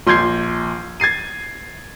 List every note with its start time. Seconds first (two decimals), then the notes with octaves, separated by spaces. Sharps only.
0.07 A#1 C6 G6 G#6 C7
1.00 G#6 A6 C7 D#7